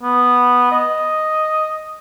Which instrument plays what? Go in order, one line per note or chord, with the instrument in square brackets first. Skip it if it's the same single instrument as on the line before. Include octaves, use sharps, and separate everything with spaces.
[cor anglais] B3
D#5